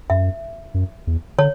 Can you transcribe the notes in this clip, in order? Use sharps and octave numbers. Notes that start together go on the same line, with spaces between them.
F#2 E5
F#2
E2
D3 C#5